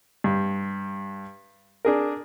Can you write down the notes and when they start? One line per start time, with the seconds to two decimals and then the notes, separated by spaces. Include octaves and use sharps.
0.24 G2
1.85 D4 G#4 A#4